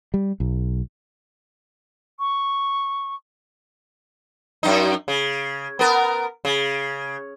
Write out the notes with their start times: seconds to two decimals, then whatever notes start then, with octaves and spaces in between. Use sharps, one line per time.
0.14 G3
0.40 B1
2.19 C#6
4.63 F#2 D#4
5.08 C#3
5.79 B3 A#4
6.45 C#3